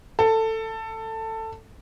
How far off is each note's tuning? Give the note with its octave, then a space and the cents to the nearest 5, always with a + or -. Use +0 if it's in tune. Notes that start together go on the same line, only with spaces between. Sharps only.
A4 +15